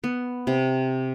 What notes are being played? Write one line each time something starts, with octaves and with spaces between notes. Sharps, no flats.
B3
C3